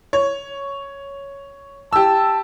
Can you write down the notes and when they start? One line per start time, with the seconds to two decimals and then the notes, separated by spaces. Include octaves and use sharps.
0.13 C#5
1.93 G4 A5 E6